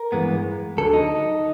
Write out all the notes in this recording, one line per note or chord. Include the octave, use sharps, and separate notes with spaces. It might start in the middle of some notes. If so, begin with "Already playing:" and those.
Already playing: A#4
G2 E3 G#3 B3
D2 D3 F#3 A4
D#4